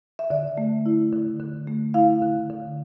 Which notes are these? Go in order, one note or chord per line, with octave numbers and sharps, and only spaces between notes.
E5
D3 D5
A3
E4
D3
D3
A3
E4 F5
D3
D3